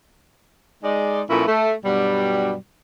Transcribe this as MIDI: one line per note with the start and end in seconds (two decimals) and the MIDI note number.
0.83 1.21 56
0.83 1.21 63
0.83 1.21 74
1.29 1.46 46
1.29 1.46 53
1.29 1.46 57
1.29 1.46 59
1.29 1.46 61
1.29 1.46 64
1.47 1.72 57
1.85 2.54 43
1.85 2.54 47
1.85 2.54 54
1.85 2.54 55